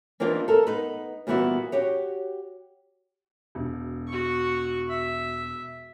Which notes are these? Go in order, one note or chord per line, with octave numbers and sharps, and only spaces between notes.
E3 A#3 C4 D4 D#4 F4
A4 A#4
B3 D#4 B4
A#2 E3 G3 B3 E4 F#4
F#4 G4 C#5
E1
F#4 C#6
E5